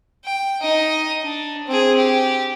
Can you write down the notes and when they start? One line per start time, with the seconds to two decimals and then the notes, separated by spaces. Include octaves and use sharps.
0.25 G5
0.62 D#4 D#5
1.24 D4
1.67 C4 G#4
1.97 G4